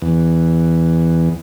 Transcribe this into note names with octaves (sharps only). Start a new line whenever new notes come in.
E2